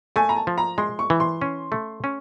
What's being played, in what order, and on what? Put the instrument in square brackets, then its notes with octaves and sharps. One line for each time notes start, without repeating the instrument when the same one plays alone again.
[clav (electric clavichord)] A3 [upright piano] G#5
[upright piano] A#5
A5
[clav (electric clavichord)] F3
[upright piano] A#5
[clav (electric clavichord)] G#3 [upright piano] C6
[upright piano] C#6
[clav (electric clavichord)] E3
[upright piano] C6
[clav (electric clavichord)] C#4
A3
C#4